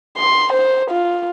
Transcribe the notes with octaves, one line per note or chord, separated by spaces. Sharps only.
C6
C5
F4